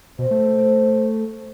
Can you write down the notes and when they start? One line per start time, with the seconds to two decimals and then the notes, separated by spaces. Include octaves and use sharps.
0.19 B2 C5
0.31 A3